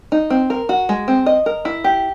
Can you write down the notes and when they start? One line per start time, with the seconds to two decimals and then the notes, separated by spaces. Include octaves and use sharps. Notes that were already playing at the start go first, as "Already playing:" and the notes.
0.12 D#4
0.30 C4
0.50 A#4
0.69 F#4
0.89 G#3
1.08 C4
1.26 D#5
1.46 A#4
1.65 E4
1.84 G4